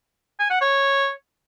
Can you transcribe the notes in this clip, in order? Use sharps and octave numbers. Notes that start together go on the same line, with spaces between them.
G#5
F#5
C#5